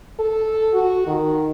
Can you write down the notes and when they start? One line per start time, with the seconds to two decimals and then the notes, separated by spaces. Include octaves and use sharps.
0.19 A4
0.74 F#4
1.07 D#3